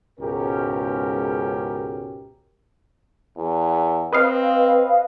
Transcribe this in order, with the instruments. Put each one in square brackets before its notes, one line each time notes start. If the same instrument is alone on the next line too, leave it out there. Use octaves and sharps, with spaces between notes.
[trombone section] C#2 G#2 B2 C#4 G4 A#4
[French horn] E2
[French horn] C4 [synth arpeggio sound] B4 D#5 F5